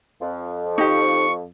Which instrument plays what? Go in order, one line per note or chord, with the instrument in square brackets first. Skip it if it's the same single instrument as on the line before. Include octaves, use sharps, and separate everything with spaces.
[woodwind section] F2 F3
[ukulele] D#4 G4 [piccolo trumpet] C#6